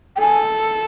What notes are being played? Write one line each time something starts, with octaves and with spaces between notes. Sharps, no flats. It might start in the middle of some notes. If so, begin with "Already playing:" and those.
G5
A4 G#5